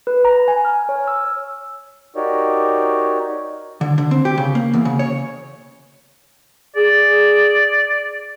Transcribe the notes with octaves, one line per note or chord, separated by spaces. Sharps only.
B4
A#5
G#5
F6
C#5
E6
D#4 F#4 G4 A#4 C#5 D5
D3
D3
C4
G4
C#3
A#3
E2
C#3
C#5
G#4 D5